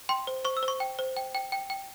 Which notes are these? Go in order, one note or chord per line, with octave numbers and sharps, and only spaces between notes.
G5 C6
C5
C5 C#6
E6
C5
C#6
G5
C5
G5
G5
G5
G5